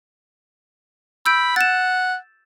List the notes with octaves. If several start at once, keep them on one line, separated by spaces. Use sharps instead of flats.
B5 E6 G6 D7
F#5 A6 E7